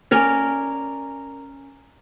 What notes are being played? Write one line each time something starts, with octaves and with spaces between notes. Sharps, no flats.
C#4 A#4 D5 G#5